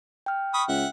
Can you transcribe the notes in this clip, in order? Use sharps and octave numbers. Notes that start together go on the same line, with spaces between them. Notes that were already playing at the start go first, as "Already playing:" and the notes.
G5 F6
B5 C#6 D#6
C#2 E5 F#5